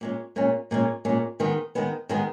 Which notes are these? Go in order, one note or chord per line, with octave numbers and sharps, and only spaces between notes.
A#2 G#3 C#4
A#2 G#3 C#4
A#2 G#3 C#4
A#2 G#3 C#4
D#3 G#3 B3
D#3 G#3 B3
D#3 G#3 B3